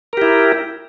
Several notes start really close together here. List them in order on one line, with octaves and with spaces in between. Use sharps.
A#4 G4 E4